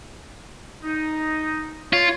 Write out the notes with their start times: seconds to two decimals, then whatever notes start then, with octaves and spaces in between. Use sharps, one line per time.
0.84 D#4
1.93 F4 C#5